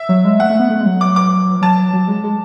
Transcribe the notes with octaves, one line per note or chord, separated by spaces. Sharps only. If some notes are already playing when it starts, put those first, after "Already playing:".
Already playing: E5
F#3
G#3
A3 F#5
A3
B3
A3
G#3
F#3
D6
D6
F#3 A5
F#3
G#3
G#3